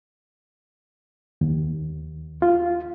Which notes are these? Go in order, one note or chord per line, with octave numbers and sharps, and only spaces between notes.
D#2
F4